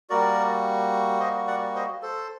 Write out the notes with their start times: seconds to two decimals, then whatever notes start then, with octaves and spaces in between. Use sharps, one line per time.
0.10 G3 A#3 F#4 A#4 D5
1.20 C5 D#5
1.47 D5 F#5
1.75 C5 D#5
2.02 A4 C5